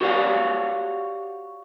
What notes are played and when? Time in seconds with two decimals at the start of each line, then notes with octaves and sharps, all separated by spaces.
0.01 F#4 G4 C#5 D5 F5 F#5